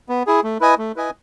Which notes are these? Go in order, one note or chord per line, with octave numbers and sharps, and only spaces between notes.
B3
E4 G#4
A3
E4 B4 D#5 G#5
A3
E4 B4 D#5 G#5